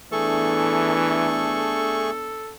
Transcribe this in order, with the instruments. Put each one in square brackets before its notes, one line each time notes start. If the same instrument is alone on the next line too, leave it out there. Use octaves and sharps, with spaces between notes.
[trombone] E3 [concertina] A3 G#4 C#6 [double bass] B3 D4 [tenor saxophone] A4